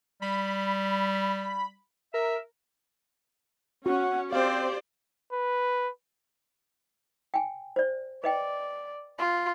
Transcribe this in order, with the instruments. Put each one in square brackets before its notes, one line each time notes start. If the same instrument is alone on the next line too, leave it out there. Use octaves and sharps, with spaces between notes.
[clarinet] G3 [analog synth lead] B5
[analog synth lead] A#4 [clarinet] E5
[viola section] C#4 [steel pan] F#4 [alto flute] F#5
[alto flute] C4 [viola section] G4 C5 D5 [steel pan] F5
[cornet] B4
[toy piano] G5 G#5
C5 D5
[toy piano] B4 D#5 G5 [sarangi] D5
[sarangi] F4